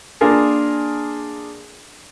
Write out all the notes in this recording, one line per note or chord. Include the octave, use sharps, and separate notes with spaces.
A#3 D4 F4 G#4 A#4